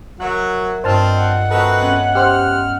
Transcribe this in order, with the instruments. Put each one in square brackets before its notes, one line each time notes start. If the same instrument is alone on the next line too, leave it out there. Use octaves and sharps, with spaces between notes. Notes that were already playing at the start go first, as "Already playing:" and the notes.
[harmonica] F#3 F#4 [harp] A#4 E5 F#6
[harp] G2 F4 D#5 [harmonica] C4 [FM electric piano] C5 A5 F6
[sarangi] F#5
[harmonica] C4 F#4 B4 [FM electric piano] A4 [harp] D#5 E5 A#5
[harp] B3 C#4
[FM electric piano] G4 C5 F#6 [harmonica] F6